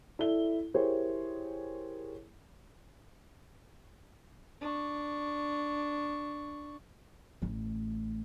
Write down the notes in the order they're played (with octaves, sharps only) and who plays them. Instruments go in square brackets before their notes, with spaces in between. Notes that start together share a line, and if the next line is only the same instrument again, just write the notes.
[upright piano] E4 A4 D5 G7
E4 G4 G#4 A#4 C5 C#5
[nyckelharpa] D4 C#6
[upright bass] A1 A3